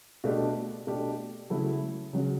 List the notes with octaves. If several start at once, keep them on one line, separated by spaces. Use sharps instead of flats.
B2 A3 D4 G4
B2 A3 D4 G4
C#3 F#3 A3 E4
C#3 F#3 C#4